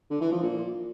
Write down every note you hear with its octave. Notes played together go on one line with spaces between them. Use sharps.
D3
E3
F3
A#2